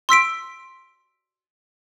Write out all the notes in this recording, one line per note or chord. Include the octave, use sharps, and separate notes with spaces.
C6 E6 B6 D7